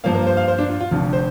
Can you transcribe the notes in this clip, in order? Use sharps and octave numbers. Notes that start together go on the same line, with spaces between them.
G2 F3 A#3 F5
A#4
C5
F5
C5
D4
F4
F4
F1 F2 D3 F4
C5